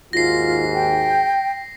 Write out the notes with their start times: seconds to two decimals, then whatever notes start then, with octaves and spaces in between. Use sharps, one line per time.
0.13 D#2 G#2 F4 F#4 A#6 C7
0.74 G5